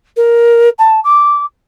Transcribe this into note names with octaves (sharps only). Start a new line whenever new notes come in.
A#4
A5
D6